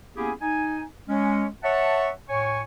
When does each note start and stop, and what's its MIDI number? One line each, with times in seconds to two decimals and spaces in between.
0.16 0.32 58
0.16 0.32 59
0.16 0.32 61
0.16 0.32 64
0.16 0.32 67
0.16 0.32 68
0.41 0.82 63
0.41 0.82 80
1.08 1.46 56
1.08 1.46 61
1.63 2.09 73
1.63 2.09 76
1.63 2.09 78
1.63 2.09 81
2.29 2.61 45
2.29 2.61 73
2.29 2.61 80
2.29 2.61 85